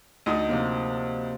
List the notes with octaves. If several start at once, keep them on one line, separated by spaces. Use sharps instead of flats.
D2 D#4 D#6
C3 F3 A#3